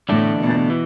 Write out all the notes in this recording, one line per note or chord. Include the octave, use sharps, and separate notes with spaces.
E2 A2 D3 A3 D4
B2
E3